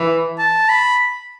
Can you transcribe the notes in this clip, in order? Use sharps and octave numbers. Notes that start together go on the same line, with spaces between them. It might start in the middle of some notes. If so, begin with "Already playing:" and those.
Already playing: E3
A5
B5